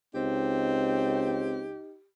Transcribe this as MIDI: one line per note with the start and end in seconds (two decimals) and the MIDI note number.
0.15 1.78 37
0.15 1.62 60
0.15 1.97 63
0.15 2.08 67